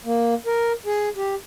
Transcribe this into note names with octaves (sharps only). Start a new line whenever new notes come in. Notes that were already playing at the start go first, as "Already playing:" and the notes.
A#3
A#4
G#4
G4